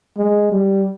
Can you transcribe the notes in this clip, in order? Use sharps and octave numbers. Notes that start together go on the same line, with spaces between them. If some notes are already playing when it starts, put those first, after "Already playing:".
G#3
G3